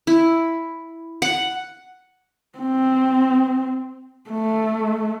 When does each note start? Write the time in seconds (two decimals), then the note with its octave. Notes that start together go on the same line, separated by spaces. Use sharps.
0.07 E4
1.22 F#5
2.59 C4
4.31 A3